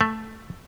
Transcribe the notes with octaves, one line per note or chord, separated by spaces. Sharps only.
A3